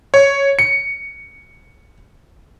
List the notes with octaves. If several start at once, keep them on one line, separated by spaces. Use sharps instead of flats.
C#5
C#7